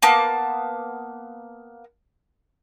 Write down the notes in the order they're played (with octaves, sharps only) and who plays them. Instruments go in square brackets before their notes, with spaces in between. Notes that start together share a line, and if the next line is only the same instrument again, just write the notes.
[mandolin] A#3 B3 A5